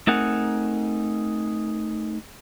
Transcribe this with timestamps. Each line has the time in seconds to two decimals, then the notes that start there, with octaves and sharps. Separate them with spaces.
0.07 A3 C4 D#4 G#4 A#4 F#5